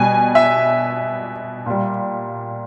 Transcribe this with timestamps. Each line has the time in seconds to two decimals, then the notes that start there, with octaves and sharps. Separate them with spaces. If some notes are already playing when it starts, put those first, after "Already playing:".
Already playing: B2 G3 G#5
0.35 E5
1.66 A#2 G3